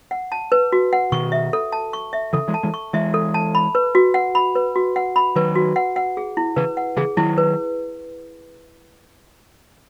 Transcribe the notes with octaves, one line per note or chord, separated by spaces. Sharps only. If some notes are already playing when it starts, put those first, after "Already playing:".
F#5
A5
B4
F#4
F#5
B2 D#3 C#6
E5
A4
A5
C#6
E5
C#3 E3 A4
E3 G#3
A5
E3 G#3
C#6
E3 G#3 E5
A4
A5
B5
B4
F#4
F#5
B5
B4
F#4
F#5
B5
D#3 F#3 B4
F#4
F#5
F#5
G#4
E4
C#3 E3 B4
F#5
C#3 E3 G#4
D#3 F#3 E4
B4